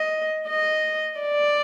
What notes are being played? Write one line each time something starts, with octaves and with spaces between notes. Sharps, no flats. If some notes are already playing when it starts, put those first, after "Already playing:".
Already playing: D#5
D#5
D5